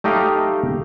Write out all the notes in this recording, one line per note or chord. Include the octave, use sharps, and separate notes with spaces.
A3 D#4 G4 D#5 F5